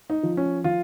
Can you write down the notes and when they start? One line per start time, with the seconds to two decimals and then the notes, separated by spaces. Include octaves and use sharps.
0.10 D#4
0.23 F3
0.37 C#4
0.64 F3 F4